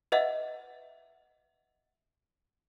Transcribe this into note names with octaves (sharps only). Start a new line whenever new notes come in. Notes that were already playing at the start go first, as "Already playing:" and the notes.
B4 D#5 E5 F#5